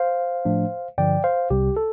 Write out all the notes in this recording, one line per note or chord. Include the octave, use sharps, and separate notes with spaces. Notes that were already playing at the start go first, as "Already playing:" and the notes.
Already playing: C5 F5
A2 F3 A3 D4
G2 D3 F3 D5 G5
C5 F5
C2 C3 G3 G4
A4